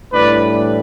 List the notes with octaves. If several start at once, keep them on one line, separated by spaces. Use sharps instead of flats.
A2 E3 G3 D4 B4 D5